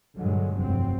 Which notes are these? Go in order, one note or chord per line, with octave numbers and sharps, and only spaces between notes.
G2 A#2 D3 F#3 G#3
F1 C2 G2 F#3 C4